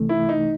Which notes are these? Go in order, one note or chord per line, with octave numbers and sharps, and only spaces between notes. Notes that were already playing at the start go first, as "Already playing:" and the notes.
Already playing: C2 C3 E3 A3
E4
D#4